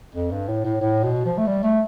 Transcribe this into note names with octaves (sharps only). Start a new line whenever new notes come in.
F2
G2
A2
A2
A2
B2
F3
A3
G3
A3